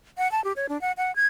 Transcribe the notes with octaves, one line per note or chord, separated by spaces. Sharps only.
F#5
A5
G4
C#5
D4
F#5
F#5
G#6